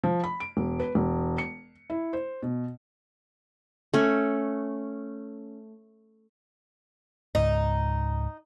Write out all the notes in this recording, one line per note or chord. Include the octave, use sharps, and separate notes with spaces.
F3
B5
D7
E1
B4
E1
C#7
E4
C5
B2
A3 C#4
C#2 G#2 D#4